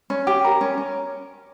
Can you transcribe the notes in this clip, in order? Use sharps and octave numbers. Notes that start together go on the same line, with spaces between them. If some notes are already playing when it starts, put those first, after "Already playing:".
C#4
G4
A#4
C#4
C#4